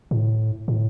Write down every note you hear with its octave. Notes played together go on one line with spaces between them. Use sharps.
A2
A2